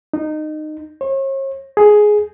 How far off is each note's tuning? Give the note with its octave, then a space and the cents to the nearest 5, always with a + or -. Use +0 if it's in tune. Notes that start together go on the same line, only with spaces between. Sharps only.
D#4 -20
C#5 -40
G#4 +10